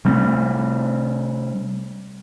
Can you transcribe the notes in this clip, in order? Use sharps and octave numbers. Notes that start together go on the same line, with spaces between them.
C3 G3 A3 C4